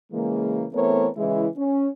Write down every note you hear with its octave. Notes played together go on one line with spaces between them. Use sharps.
C#3 E3 G#3 A#3
E3 A3 B3 C4 A#4 C#5
C#3 E3 G#3 E4
C#4